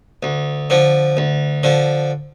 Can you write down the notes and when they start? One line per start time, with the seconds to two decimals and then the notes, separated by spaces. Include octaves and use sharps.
0.23 D2
0.70 D3 F3
1.17 D2
1.63 D3 F3